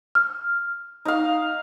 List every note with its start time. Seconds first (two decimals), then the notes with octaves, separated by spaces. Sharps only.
0.15 F6
1.05 D#4 F5